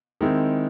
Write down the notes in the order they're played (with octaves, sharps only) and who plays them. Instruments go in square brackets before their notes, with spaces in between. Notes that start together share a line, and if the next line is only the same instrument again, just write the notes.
[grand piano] D#3 G#3 C4 E4